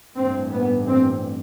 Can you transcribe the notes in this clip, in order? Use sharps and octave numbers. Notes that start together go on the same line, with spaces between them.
A1 G2 C4
B3
C4